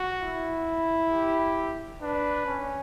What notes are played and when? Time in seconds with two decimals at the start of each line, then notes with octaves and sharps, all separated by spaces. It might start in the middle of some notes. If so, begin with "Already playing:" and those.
Already playing: F#4
0.21 E4
1.11 G4
2.02 D4 B4
2.46 C#4